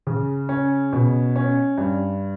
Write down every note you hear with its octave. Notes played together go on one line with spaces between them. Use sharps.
C#3
C#4
B2
C#4
G2